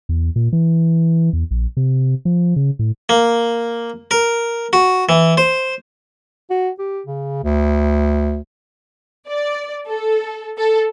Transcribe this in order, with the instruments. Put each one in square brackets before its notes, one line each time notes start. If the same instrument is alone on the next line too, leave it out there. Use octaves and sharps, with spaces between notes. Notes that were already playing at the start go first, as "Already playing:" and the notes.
[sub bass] E2
A#2
E3
E2
A#1
C3
F3
C#3
A2
[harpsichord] A#3
A#4
F#4
E3
C5
[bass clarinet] F#4
G4
C#3
D2
[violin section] D5
A4
A4